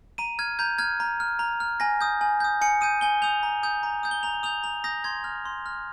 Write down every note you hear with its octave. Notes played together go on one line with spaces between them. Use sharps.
A#5 D#7
F6 G#6
A#5 G6
F6 G#6
A#5
F6
A#5
F6
G#5 A#6
D#6 G6
G#5
D#6 G6
G#5 C#7
D#6 G6 D#7
G#5 G7
D#6 G6 F7
A#5
D#6 G6
A#5
D#6 G6
G7
A#5 F7
D#6 G6 F7
A#5 F7
D#6 G6 A#6
C6 G#6
F6
C6
F6